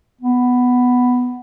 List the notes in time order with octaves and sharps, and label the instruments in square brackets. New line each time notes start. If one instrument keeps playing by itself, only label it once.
[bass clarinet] B3